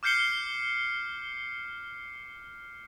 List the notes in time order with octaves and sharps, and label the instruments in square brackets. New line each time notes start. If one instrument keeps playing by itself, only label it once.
[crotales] D6 F6 G6 C7 C#7 G7